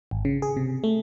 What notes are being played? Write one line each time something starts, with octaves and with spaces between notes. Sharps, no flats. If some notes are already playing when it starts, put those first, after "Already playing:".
G#1
C#3
G#4
C3
A3